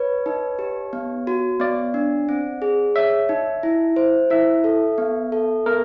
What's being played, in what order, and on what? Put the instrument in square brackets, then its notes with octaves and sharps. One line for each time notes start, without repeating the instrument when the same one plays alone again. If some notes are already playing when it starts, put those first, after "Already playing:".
Already playing: [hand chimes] B4 [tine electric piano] C#5
[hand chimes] D#4
G4
B3
F#4
[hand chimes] B3 [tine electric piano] D5
[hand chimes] D4
C4
G#4
[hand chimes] C#5 [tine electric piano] E5
[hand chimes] D#4
E4
C5
[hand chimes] E4 [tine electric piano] E5
[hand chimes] A4
B3
A4
[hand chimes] B3 [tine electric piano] A#4